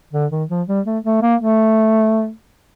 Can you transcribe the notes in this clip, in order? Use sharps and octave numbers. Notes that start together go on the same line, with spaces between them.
D3
D#3
F3
G3
A3
A3
A#3
A3